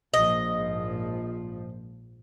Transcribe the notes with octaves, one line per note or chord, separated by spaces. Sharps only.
A#1 G#2 F3 D#5